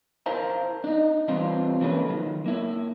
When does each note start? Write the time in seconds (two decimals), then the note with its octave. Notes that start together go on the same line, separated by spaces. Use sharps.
0.26 E4 A#4 C5 F5 A5 A#5
0.84 D4 D#4
1.28 G2 E3 C4 D4 F4
1.81 E3 F#3 A#3 C#4 A4 B4
2.10 D#3 F#3
2.46 A#3 E4